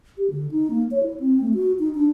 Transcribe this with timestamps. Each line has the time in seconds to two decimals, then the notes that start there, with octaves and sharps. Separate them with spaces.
0.18 G4
0.30 D3
0.51 D#4
0.70 A#3
0.91 C#5
1.03 E4
1.20 C4
1.41 A3
1.54 F#4
1.79 D#4
1.95 D4